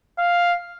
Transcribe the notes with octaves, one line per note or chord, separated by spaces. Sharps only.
F5